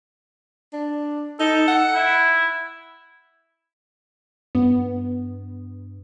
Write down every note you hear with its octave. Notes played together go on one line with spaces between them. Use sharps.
D4
D#4 A4
F#5
E4
G2 B3